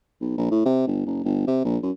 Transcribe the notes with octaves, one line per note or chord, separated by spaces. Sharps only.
B1
A#1
A2
C3
G1
F#1
G1
C3
A#1
F#2